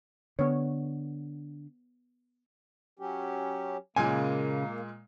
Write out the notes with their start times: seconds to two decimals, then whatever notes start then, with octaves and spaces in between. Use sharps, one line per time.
0.39 D3 B3 C#5
2.99 F#3 C#4 G4
3.96 A#2 C#3 G#3 A#3 G#5